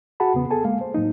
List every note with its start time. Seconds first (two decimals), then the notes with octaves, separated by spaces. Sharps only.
0.20 F#4 G#4 F#5 A5 B5
0.34 E2 C#3 B3
0.50 G#4 A4 G#5 A5
0.64 G#3 A#3 F5
0.81 C5
0.94 A2 F#3 A#3 D#4